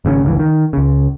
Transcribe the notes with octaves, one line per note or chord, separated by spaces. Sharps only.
G#1 C#3 C4 C#4
G1 C#2 C3 E3
D#3
C#2 C#3